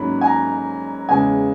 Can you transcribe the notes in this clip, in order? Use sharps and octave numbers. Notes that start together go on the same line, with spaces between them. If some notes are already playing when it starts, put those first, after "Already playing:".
Already playing: G#2 F#3 A#3 C#4 B5
G#5
A#5
E2 C#3 G#3 G#5